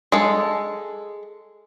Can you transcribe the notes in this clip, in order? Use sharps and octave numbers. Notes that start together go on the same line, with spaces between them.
G#3 A4